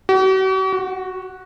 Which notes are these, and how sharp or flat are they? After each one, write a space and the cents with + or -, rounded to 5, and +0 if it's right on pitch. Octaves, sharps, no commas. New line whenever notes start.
F#4 +45
F#4 -5